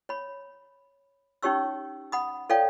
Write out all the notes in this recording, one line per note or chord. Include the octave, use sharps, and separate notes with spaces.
C#5 B5
C#4 D#4 G4 C#5 C#6 E6
F#5 B5 D#6
A4 C#5 D5 F5 G5